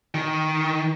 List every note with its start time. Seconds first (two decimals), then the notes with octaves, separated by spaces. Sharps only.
0.14 D#3